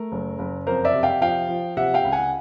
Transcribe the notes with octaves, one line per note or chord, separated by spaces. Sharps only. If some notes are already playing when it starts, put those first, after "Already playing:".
Already playing: A3 A#4
F#1
F#1
F2 A#4 C5
D5 E5
C3
F5 G5
F3 F5 G5
F3
C3 E5 F#5
F5 G5
C#2
F#5 G#5